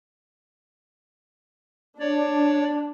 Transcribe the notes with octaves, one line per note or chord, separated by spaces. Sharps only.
D4 C#5 D5